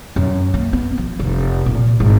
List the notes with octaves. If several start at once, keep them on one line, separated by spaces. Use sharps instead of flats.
F#2
A#3
B3
F3
F1
A#2
G#1